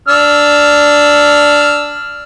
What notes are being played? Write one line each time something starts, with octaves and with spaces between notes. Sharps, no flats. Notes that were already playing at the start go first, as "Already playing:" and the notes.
D4 E6 F6